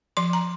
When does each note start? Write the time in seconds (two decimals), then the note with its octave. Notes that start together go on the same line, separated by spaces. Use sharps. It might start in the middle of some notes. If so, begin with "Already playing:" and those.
0.17 F3 C6
0.33 A#5